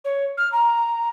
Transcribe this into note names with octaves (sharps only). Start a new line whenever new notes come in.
C#5
F6
A#5